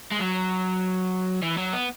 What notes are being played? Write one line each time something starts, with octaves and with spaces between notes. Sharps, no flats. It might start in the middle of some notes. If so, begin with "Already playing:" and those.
G#3
F#3
E3
F#3
B3